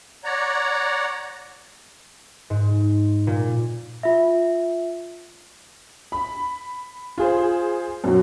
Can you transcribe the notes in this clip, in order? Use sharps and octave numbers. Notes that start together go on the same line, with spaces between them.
C#5 D5 F#5 A#5
G#2
A#2
F4 E5
B5
F4 G#4 C5
F#2 B2 F#3